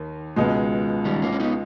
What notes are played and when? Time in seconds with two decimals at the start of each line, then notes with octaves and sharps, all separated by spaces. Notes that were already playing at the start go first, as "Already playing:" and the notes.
Already playing: D#2 D#3
0.36 C#2 B2 G#3
1.05 D#3 G3
1.22 A#3 C#4
1.32 C#4
1.40 B3 D#4